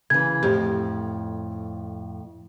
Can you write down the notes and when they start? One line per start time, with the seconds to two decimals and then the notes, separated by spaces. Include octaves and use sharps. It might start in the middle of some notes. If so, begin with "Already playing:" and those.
0.10 C#3 E3 G#6
0.43 F2 A2 G4